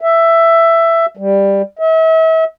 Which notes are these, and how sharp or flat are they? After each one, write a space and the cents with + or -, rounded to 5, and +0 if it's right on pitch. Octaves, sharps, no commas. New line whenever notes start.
E5 +10
G3 +10
E5 -40